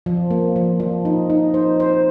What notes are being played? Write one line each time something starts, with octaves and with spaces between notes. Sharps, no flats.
F3
A#3
F3
F3
D#4
D#4
C5
C5